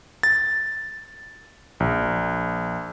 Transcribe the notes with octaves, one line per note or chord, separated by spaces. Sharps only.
A6
A#1